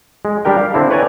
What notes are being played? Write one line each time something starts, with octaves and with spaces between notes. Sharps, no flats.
G#3
G3 D4 G4 A#4 G5
F5
D3 C4 D4 E4
B4 C#5 D5 G5 G#5 A#5